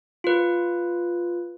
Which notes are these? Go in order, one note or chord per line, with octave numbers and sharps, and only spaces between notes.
F4 B4